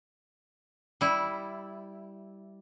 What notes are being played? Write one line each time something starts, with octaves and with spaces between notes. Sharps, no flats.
G3 E4